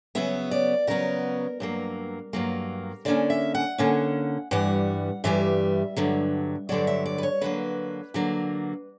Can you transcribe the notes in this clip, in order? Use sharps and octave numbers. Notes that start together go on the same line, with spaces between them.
C#3 F#3 B3 E5
D5
C#3 F#3 B3 A#4
G2 F#3 A#3
G2 F#3 A#3
D3 A#3 C#4 D5
E5
F#5
D3 A#3 C#4
G2 E3 G3 F#5
G2 E3 G3 E5
G2 D3 F#3
G2 D3 F#3 D5
E5
D5
B4
C#5
D3 F#3 A#3 B4
D3 F#3 A#3